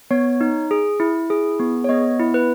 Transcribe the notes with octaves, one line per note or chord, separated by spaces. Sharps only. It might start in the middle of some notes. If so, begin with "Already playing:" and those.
B3 C#5
D#4
G#4
E4
G#4
B3
C#5
B3 D#5
E4
B4